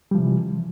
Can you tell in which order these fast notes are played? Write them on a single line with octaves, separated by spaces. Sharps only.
G3 F3 C3 E3